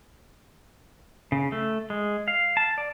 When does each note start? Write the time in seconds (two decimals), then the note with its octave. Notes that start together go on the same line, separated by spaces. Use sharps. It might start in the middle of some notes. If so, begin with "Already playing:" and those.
1.32 C#3
1.52 A3
1.90 G#3
2.28 F5
2.57 A5
2.78 D5